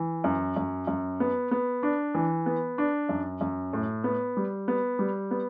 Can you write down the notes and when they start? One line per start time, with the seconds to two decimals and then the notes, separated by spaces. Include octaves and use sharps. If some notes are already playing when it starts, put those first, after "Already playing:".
Already playing: E3
0.24 F#2
0.56 F#2
0.87 F#2
1.20 B3
1.51 B3
1.83 D4
2.15 E3
2.46 B3
2.78 D4
3.09 F#2
3.41 F#2
3.73 A2
4.04 B3
4.37 G3
4.68 B3
4.99 G3
5.31 B3